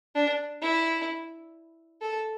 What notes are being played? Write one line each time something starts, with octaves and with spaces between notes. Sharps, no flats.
D4
E4
A4